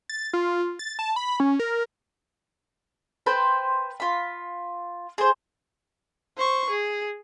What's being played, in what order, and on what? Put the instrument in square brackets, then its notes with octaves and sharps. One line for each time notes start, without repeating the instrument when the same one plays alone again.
[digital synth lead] A6
F4
A6
A5
B5
C#4
A#4
[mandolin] B4 C5 G5 A5
F4 B5
G#4 C5
[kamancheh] C5 C#6
G#4